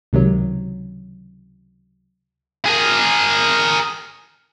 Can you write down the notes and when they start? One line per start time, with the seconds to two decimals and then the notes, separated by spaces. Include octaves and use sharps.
0.13 C#2 C3 D#3 F#3
2.65 G#4 A#4